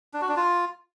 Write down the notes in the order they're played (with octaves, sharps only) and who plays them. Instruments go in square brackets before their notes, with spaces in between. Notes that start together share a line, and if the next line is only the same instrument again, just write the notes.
[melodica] D4
F#4
D4
F4